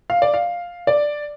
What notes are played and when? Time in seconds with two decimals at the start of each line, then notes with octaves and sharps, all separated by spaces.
0.10 F5
0.22 D5
0.34 F5
0.87 D5